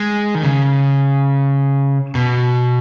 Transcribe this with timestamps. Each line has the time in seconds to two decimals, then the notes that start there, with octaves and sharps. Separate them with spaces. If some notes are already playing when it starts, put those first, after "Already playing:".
Already playing: G#3
0.35 D#3
0.43 C#3
2.15 B2